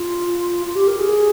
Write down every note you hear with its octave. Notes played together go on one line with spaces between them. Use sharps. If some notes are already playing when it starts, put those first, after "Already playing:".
Already playing: F4
F4
G4
A#4
G#4